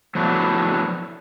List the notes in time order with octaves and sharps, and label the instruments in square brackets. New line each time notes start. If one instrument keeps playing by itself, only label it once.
[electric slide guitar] F3 F#3 A3 B3 D4 E4